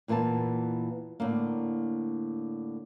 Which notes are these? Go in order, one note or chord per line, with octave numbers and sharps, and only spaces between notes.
E2 A#2 E3 A#3 A5
A2 D3 A#3